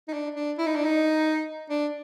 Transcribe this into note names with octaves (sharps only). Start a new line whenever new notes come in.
D#4
D4
D4
E4
D#4
D4
D#4
D4